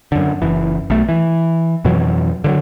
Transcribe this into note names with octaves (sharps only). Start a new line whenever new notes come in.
F#2 D3
F#1 E3
B1 A3
E3
F2 B2 E3 F#3
D3 F3 F#3